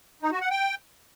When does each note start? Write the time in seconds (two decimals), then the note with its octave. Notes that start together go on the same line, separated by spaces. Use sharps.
0.22 D#4
0.32 F#4
0.41 F#5
0.51 G5